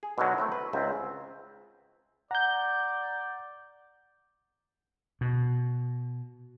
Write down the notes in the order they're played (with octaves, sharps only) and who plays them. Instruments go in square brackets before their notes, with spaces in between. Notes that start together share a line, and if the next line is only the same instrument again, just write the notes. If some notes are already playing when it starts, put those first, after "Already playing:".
[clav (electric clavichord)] G#4
B2 D3 D#3 F#3
A3 C4 E4
B4
C#2 G#2 C4 E5
[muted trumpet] D5 [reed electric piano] F#5 [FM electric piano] A#5 G6
[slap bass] B2